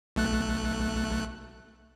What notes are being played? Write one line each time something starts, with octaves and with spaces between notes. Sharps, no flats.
B1 A3 F#6